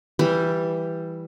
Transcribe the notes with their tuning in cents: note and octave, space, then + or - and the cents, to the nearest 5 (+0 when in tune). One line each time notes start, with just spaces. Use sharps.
E3 +0 G3 +0